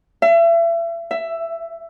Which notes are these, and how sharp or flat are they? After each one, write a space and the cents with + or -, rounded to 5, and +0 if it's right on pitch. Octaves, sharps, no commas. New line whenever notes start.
E5 +35
E5 +10